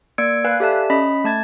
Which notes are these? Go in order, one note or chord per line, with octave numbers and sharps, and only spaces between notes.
A#3 D5 E6 G#6 C#7 D7
B4 F5 G#5 F#6
G4 A4 D5 E5 A5
C#4 D#5 B5 B6
A3 A5 G#6 A6